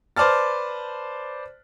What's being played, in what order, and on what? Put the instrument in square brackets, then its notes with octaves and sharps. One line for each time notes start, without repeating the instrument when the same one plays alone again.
[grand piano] B4 C5 D5 A5 F6 A6